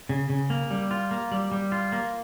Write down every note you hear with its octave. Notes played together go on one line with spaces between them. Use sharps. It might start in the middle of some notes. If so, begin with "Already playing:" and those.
C#3
C#3
A#3
G3
F4
A#3
G3
G3
F4
A#3